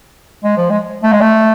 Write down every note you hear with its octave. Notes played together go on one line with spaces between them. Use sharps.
G#3
F3
G#3
A3
G#3
A3